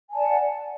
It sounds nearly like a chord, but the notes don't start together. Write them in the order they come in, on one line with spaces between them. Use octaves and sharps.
G#5 A5 D5 F#5